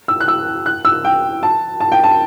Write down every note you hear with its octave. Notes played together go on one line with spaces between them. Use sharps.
E6
F#6
E6
F#6
E6
G5
A5
A5
G5
A5